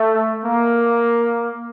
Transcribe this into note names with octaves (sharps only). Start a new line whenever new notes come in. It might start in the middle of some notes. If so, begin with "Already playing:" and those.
Already playing: A3
A#3